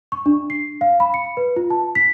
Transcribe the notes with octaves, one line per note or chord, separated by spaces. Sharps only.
C#6
D4
C7
F5
B5
C#7
B4
F4
A5
B6